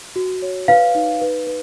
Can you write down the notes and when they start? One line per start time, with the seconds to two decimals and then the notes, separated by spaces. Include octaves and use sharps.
0.16 F#4
0.42 C#5
0.68 B4 F5
0.95 D#4
1.21 B4
1.47 B4